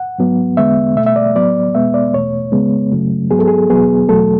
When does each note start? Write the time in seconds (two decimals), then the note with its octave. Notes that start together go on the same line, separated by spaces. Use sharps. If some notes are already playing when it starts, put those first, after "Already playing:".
Already playing: F#5
0.19 G#2 F#3 B3
0.57 E2 D3 G#3 B3 E5
0.96 B2 A3 E5
1.06 E5
1.16 D5
1.35 A2 F#3 B3 D5
1.75 E2 B2 G#3 B3 E5
1.94 D5
2.13 E2 B2 A3 C#5
2.52 C#2 C#3 G#3 B3
2.91 F#2 C#3 F#3 A3
3.31 G#2 F#3 B3 G#4
3.39 A4
3.47 G#4
3.70 E2 B2 F#3 B3 G#4
4.09 E2 B2 F#3 A3 A4